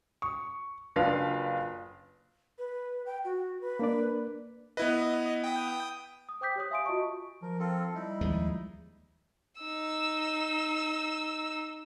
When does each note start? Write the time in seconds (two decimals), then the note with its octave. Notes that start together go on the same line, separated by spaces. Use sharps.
0.22 C#6
0.96 F#1 D4 F4 B4 F5
2.58 B4
3.06 G5
3.25 F#4
3.61 B4
3.79 A#3 D4 D5
4.77 B3 E4 B4 D#5
5.44 G5 D#6
6.29 D#6
6.41 C5 G5 D6 G6 B6
6.56 G4 C#5 D#6
6.71 E5 F5 G#5 C6 D#6 D7
6.86 F4 F#4 D#5 A5 C#6
7.42 F3 A#4
7.59 C4 F4 A4
7.94 G3 D#4 E4
8.21 D#2 F3 G#3
9.61 D#4 E6